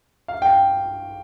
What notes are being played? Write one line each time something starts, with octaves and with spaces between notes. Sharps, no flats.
F5
G5